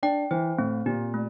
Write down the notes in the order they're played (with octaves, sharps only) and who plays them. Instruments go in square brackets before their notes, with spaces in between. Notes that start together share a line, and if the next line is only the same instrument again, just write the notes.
[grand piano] D4 [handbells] G5
[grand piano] E3 [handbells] C5
[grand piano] A2 [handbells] C4
[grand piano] A#2 [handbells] G4
[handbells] A3